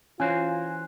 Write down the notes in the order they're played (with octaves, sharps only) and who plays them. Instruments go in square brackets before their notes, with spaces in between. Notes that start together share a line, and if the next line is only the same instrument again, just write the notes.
[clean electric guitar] E3 F#4 C5 [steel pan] C#4 [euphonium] F4 [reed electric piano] G#5